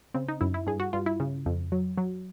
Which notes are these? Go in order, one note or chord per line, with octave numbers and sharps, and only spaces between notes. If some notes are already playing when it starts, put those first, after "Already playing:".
C#3 C4
D#4
F#2 E4
E4
G2 G#4
F#4
G2 F4
E4
C#3
F2
F#3
F#3